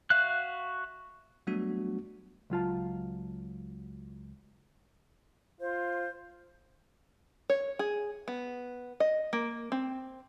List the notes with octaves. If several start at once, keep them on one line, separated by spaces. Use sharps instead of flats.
F#4 E5 F5 F#6
F#3 G3 A3 B3 D4 F#4
C#2 F#3 F4 A5
F4 C5
C#5
G#4
B3
D#5
A#3
C4